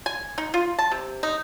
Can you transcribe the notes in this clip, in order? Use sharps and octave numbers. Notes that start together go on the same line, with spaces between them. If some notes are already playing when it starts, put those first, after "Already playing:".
G#5
D#4
F4
A5
C3
D#4